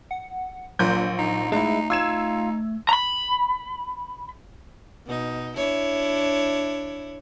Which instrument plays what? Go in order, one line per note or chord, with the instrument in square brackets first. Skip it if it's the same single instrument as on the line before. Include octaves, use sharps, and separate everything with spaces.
[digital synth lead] F#5
[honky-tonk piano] A#1 G6 [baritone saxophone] A#2 [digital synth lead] F#3
[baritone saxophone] D#4
[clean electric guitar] G#3 E4 [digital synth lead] A3 [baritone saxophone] D#4
[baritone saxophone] D#4 [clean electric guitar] F4 [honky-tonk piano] E6 G#6 E7
[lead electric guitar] A#5 B5
[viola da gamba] B2 D#4
D4 E4 C#5